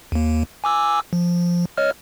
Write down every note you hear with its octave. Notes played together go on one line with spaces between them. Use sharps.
D#2 A#3
G#5 D6 E6
F3
C#5 D#5 F6